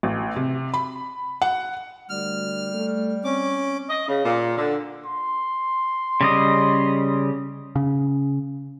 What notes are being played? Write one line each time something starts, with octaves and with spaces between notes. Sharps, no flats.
A1
C3
B5
F#5
D2 G3 F6
A3
C4 C#4 D6
D#5
C#3
A#2
D3
C6
C#3 G3 D#5
C#3